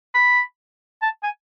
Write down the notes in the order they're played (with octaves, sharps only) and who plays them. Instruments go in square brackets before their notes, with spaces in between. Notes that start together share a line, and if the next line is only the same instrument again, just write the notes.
[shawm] B5
A5
G#5